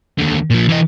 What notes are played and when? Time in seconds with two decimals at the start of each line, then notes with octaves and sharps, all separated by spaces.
0.18 D#2 D3
0.50 A#2 F3
0.69 E3 D#5